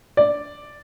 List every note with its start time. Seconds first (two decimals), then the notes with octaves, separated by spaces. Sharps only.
0.17 D5